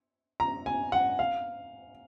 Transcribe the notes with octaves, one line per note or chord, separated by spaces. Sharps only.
A#5
G#5
F#5
F5